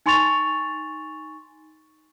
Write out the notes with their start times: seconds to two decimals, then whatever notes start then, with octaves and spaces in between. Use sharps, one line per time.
0.06 D#4 G#5 C6 C#6 A6 F7